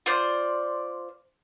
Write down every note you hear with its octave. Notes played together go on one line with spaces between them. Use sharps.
F4 C5 D5